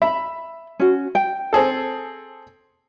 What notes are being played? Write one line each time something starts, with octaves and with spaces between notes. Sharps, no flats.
E5 B5
C#4 F#4
G5
C4 G#4 A4